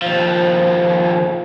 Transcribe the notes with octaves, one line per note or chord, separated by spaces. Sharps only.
D#2 F3